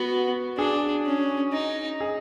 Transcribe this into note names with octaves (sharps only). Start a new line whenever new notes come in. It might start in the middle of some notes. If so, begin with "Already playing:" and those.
Already playing: B3 F#4
D4 G#4
C#4
D#4
G#4